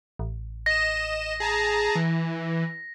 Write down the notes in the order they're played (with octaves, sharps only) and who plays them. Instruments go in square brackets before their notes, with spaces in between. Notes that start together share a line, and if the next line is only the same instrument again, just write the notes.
[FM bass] A1
[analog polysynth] D#5 E7 [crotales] A#6
[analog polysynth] G#4 A5 A#5
E3